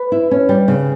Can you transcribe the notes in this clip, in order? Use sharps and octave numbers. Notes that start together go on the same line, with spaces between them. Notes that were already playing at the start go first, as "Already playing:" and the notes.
Already playing: B4
E4
C#4
G3
C#3